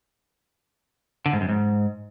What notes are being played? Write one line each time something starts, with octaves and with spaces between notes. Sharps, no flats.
D3
G#2
F#2
G#2